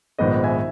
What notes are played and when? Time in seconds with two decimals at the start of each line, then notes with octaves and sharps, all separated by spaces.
0.19 A#1 G#2 D#3 G#3 B3 D#5
0.43 E5 G#5